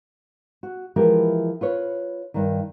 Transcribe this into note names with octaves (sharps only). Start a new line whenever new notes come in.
F#4
E3 F3 G#3 E4 G4 A#4
F4 B4 C#5
G2 D#3